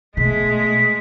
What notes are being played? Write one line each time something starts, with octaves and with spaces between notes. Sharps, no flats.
B2 G#3 A3 B6